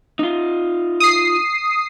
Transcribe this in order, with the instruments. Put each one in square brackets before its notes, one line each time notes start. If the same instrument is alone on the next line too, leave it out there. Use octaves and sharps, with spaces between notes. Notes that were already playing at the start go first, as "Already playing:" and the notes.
[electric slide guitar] D#4 F4
[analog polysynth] D#6 C7